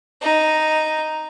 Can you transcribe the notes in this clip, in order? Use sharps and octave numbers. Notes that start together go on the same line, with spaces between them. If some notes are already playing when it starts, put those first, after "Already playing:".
D#4